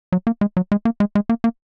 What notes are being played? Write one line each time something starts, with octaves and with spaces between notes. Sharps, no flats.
F#3
A#3
G#3
F#3
G#3
A#3
G#3
G#3
A#3
A#3